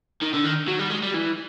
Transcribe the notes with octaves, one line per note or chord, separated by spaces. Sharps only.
D#3
D3
D#3
F#3
G3
G#3
G3
E3